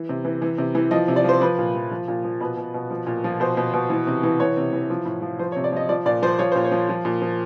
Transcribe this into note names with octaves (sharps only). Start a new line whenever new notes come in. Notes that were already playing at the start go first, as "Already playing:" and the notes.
Already playing: E3
C3
E3
E3
C3
E3
F3 D#5
C3
D5
F3 C5
F3 B4
A#2
F3
F3
A#2
F3
B2 B4
B2
B2
F3
A#2
F3
B2 C5
B2
B2
E3
C3
E3
E3 C#5
C3
E3
F3
A2
F3
F3 C5
C#5
C3
D5
F3 D#5
F3 D5
A#2 D5
F3 C5
F3 C#5
A#2 C5
C#5
F3
F3
A#2
F3